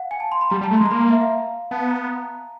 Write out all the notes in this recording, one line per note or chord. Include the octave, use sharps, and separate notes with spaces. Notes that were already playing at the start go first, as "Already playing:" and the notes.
Already playing: F5 F#5
G#5
A5
C6
B5
G3 A#5
G3 A5
A3
G#3 C6
A#5
A#3 B5
A#5
E5
F5
B3 A5
A#5